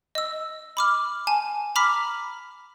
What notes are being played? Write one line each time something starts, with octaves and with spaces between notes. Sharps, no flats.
D#5 E6
B5 D6 F6
G#5 A5
A#5 B5 D6 F6 B6